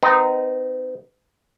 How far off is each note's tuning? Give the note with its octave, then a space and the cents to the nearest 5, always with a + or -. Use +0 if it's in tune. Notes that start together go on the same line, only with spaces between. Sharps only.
C4 -45 D#4 -5 B4 -20